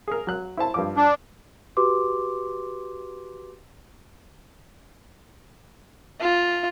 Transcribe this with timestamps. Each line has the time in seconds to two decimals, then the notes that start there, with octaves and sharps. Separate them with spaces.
0.08 G#4 A#4
0.27 F#3 F#6
0.57 E4 C5 A5
0.74 G2 F3 D6
0.96 D4
1.77 F#4 G4 B4 C6 D6
6.21 F4